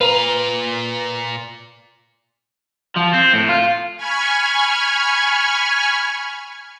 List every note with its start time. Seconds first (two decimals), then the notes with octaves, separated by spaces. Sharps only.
0.01 A#2 B4 F5 A#5
2.96 F3
3.14 C4
3.34 A2
3.49 F4
3.97 G#5 B5 C#6 F6 G#6